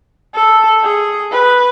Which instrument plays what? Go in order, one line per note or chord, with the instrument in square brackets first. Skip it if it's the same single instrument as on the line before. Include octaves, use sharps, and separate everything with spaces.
[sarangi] A4
G#4
B4